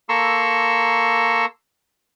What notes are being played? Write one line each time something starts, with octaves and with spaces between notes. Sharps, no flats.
A#3 A4 A#5 C6 C#6 E6